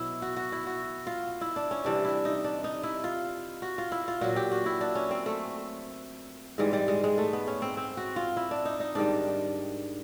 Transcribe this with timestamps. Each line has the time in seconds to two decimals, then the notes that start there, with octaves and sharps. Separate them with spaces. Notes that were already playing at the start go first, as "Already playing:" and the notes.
Already playing: B2 F#3 E4
0.22 F#4
0.37 F#4
0.52 E4
0.67 F#4
1.07 F4
1.41 E4
1.56 D4
1.71 C#4
1.85 C3 E3 G3 D4
2.05 E4
2.25 D#4
2.44 D4
2.64 D#4
2.83 E4
3.04 F4
3.62 F#4
3.78 F4
3.92 E4
4.08 F4
4.21 A#2 F#3 F#4
4.36 G4
4.52 F#4
4.66 E4
4.81 D4
4.95 C#4
5.11 C4
5.26 A3
6.58 G#2 E3 G3 G#3
6.73 G3
6.88 G#3
7.04 G#3
7.18 A3
7.33 B3
7.48 C#4
7.62 C4
7.77 C4
7.97 F#4
8.16 F4
8.37 E4
8.51 D4
8.65 D#4
8.80 D#4
8.95 G#2 D#3 G3 D4